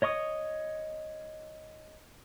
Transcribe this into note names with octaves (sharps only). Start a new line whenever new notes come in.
C#5 D#5 C#6 D#6